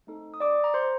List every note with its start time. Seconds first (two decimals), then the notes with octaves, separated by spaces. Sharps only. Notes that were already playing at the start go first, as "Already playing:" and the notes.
0.07 A3 C4 D#4 A4
0.34 D#6
0.40 D5 D6
0.64 A#5
0.74 C5 C6